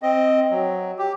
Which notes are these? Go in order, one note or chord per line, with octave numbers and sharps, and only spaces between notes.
C4 D#5
F#3
G4